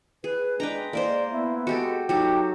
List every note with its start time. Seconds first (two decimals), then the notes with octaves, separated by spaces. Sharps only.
0.24 G#4 B4
0.60 G#3 D4 B4 G5 A#5
0.93 A#3 A#4 C5 D5
1.33 B3 E4
1.67 G#3 F#4 G4 A4
2.09 F#3 D#4 F#4 G4 A4